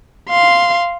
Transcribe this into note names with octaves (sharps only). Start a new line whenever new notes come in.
F5 C6